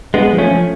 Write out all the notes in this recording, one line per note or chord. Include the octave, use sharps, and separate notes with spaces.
G#3 B3 D4
F3
A3 C#4
F3